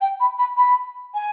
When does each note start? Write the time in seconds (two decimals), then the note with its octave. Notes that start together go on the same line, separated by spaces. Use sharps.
0.01 G5
0.19 B5
0.38 B5
0.56 B5
1.14 G#5